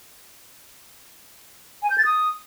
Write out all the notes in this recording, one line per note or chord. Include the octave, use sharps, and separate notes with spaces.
G#5
G6
A6
D#6